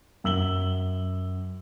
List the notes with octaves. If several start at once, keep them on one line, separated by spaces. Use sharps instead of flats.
F#2 E6 F#7 G7